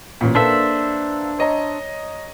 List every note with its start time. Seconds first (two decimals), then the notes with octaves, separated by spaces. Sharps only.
0.21 A1 A#2
0.35 A#3 D4 A4 B4 C5 E5
1.39 C#5 D#5 A#5